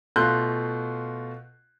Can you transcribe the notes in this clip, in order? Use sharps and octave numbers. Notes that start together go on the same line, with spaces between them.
B2 A3 F4 C6 F#6 G6